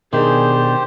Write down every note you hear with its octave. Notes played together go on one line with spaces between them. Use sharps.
B2 D#3 D4 G4 G#4 C5